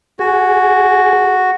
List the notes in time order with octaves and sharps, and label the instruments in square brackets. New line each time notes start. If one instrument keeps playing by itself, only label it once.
[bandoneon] F#4 [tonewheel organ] G#4